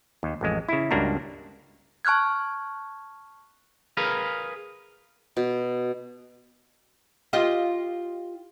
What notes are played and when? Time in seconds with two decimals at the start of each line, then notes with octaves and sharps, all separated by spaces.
0.23 D#2
0.41 A1 F2 G#3
0.69 C#3 E4
0.91 C#2 G2 A#3 D4 F#4 A#5
2.05 A5 C#6 F6 F#6 G#6
3.97 G#4 A#4 B4 F5
5.37 B2
7.33 F4 G4 D#5